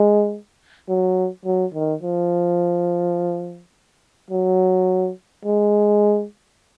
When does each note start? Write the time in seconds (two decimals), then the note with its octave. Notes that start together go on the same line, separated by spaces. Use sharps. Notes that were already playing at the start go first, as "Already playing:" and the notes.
Already playing: G#3
0.88 F#3
1.45 F#3
1.74 D#3
2.02 F3
4.30 F#3
5.45 G#3